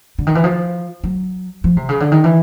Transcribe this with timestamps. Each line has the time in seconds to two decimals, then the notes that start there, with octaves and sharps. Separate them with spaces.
0.18 D3
0.27 D#3
0.35 E3
0.44 F3
1.04 F#3
1.64 F3
1.77 C3
1.89 C#3
2.00 D3
2.12 D#3
2.24 E3